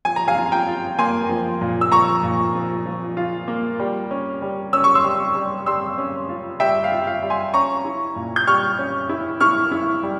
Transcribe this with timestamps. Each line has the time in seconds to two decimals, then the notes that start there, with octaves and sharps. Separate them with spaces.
0.05 F3 G#5
0.16 A#5
0.28 F5 G#5
0.36 F4
0.52 G5 A#5
0.67 F4
0.99 A#3 G#5 C6
1.29 F3
1.61 A#2
1.81 E6
1.92 F3 A#5 C#6
2.23 A#2
2.55 F3
2.86 F3
3.17 F4
3.48 A#3
3.80 G3
4.11 C#4
4.42 G3
4.73 C#4 E6
4.84 C#6
4.95 C6 E6
5.04 G3
5.35 G3
5.66 G3 C6 E6
5.98 C#4
6.29 F4
6.60 G3 E5 G5
6.84 F5
6.92 F4
7.07 F5
7.22 G3
7.30 G#5 C6
7.54 C#4 A#5 C#6
7.85 E4
8.16 A#2
8.36 G6
8.47 G3 C#6 F6
8.79 C#4
9.09 E4
9.40 E4 C#6 F6
9.72 E4
10.03 G3